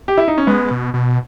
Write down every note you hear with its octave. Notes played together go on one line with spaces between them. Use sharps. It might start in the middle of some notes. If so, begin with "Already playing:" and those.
G4
E4
D#4
C#4
G#3 B3
B2
B2